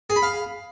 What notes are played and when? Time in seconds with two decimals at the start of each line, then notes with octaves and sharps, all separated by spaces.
0.10 G#4
0.16 B5
0.22 F5